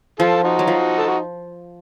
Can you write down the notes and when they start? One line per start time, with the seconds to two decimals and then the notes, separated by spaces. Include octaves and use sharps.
0.19 F3 F4 A4
0.43 D#4 F#4
0.59 F#3
0.67 F3
0.97 A4
1.07 F#4